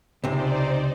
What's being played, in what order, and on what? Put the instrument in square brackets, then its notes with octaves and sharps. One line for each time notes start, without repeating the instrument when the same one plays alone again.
[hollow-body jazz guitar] C#2 C3 [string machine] D#4 C5 D5